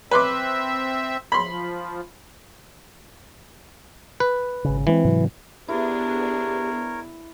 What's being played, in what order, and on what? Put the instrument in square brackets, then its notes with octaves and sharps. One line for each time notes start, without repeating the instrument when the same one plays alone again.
[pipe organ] C4 E5 [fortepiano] B4 C6 D6
[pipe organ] F3 [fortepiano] B5 C6
[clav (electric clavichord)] B4
[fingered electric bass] G#1 C#3
[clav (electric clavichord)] E3 [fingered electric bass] G#3 A#3 C4
[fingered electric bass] G#2 C3 F#3
[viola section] B3 D4 G#4 [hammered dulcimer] E4 [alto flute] G4 [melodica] A#4 C#5